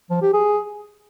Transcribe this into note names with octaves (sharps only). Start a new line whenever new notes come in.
F3
G4
G#4